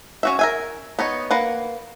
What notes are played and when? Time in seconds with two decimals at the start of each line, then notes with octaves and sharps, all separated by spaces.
0.23 C#4 F#4 E5
0.39 A#4 E5 G#5
0.99 B3 D#4 C#5
1.31 A#3 B4 F#5